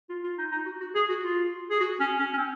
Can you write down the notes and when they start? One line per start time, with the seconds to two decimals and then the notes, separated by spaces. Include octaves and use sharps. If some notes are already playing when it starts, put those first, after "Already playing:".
0.09 F4
0.24 F4
0.38 D#4
0.52 D#4
0.66 F#4
0.81 F#4
0.95 G#4
1.09 F#4
1.24 F4
1.70 G#4
1.81 F#4
2.00 C#4
2.19 C#4
2.34 C#4
2.37 C4